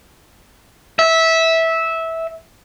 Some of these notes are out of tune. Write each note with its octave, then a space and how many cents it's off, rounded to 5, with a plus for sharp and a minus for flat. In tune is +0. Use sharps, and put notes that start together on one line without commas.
E5 -15